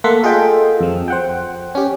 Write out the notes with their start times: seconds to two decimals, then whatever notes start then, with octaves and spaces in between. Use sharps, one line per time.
0.04 A3 A#3 A4 F#5 C6 B6
0.24 F4 G#4 A4 D#5 G5
0.81 F2 F3
1.08 C5 F#5 G5
1.75 C#4 G4